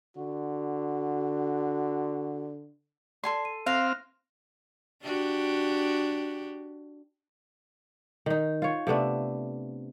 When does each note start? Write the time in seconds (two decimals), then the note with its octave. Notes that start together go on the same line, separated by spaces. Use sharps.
0.17 D3 F#4
3.24 A4 D5 G#5 A5 C6
3.45 D#7
3.67 C4 F5 F6 F#6 A#6
5.03 D4 F#4 G4
8.26 D#3 D#4
8.62 F4 C#5
8.87 C3 A3 B3 D4